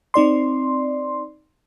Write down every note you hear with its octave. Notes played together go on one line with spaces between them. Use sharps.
C4 D#4 D5 C6